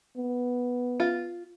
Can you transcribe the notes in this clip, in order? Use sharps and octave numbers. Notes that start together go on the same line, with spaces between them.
B3
F4